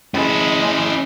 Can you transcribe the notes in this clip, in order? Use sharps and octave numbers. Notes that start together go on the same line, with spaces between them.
G#3 C#4 E4